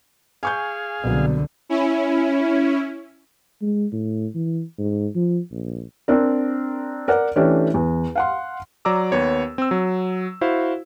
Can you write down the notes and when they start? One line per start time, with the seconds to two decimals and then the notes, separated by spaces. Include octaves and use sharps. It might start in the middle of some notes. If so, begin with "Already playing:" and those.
0.43 G#4 F5 G#5 C#6 G6
1.04 C2 B2 D3 F#3 B3
1.69 C#4 E4
3.61 G#3
3.92 A2
4.35 E3
4.78 G#2
5.15 F3
5.51 A#1
6.08 C4 D4 A#4
7.08 A#4 D5 F#5
7.36 E3 A3 C#4 D4 G4
7.74 E2
8.15 F5 F#5 C6
8.85 F#3 D5 A#5 D6 E6
9.12 D#2 B3 C#5
9.58 C4 E6
9.71 F#3
10.41 E4 F#4 C5 F5